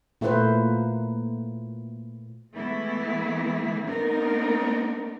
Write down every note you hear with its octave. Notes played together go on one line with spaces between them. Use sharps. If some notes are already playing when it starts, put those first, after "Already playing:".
A#2 A3 A#3 E4 B4 C5
E3 G#3 A3 B3 E4
A3 B3 C4 D4 D#4 A#4